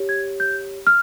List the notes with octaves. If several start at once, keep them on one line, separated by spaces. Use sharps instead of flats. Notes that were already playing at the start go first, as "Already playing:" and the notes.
Already playing: G4 C#5
G#6
G6
F6